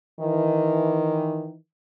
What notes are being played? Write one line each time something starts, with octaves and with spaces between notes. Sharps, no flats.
D#3 E3